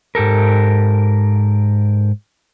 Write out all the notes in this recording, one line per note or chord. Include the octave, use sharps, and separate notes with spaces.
G#2 G4 A4 A#4